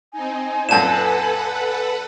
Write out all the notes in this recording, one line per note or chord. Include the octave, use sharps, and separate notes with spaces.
C4 D#4 G#5
F#2 A#2 A4 B4 F#5 A5 E7